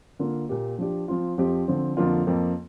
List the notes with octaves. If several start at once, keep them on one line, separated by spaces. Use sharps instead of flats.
D3 A#3 F4
A#2 A#3 G4
F3 D4 G4
F3 C4 F4
F2 F3 C4 G4
D3 F3 C4
F2 D3 F3 A#3 F4
F2 F3 A#3